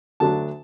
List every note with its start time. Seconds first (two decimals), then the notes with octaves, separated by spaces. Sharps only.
0.20 D2 D3 F#3 D4 A5